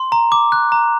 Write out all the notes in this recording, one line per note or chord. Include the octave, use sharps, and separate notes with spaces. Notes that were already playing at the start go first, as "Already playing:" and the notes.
Already playing: C6
A#5
D6
F#6
A#5